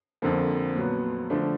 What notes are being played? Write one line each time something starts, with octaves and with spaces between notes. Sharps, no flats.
F2 D3 F3 A#3
A#2 F#3 B3
D3 F3 A3 D4